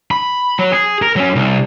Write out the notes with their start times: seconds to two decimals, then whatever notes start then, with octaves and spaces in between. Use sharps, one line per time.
0.11 B5
0.59 F#3
0.72 G#4
1.02 A#4
1.16 F#3 C#4
1.35 C2